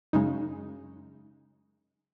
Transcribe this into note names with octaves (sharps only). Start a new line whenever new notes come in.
F#2 C#3 G#3 D#4